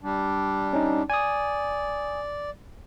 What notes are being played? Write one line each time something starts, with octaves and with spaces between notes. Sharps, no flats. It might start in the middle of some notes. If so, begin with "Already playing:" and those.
G3 D4
C#4 D#4
D5 G#5 D#6